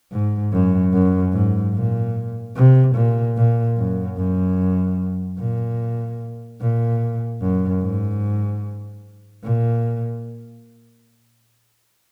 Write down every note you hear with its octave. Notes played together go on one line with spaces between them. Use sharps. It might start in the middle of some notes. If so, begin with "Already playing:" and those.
G#2
F#2
F#2
G#2
A#2
C3
A#2
A#2
F#2
F#2
A#2
A#2
F#2
G#2
A#2